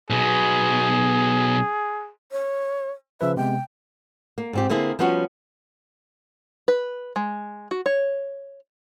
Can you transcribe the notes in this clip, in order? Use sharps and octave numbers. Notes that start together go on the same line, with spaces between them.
B1 B2 G#4
C#5
C#3 F3 B4 E5
C3 G#3 B3 G5
A#3
G#2 C4 G4
D3 A#3 C4 E4 G#4
F3 G3 B3 C#4 D#4 F#4
B4
G#3
F#4
C#5